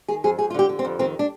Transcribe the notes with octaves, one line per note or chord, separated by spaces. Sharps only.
D#3 G#4
F2 G#4
F2 G#4
F4
D3 G4
D3
C4
F2
D#3 C4
D4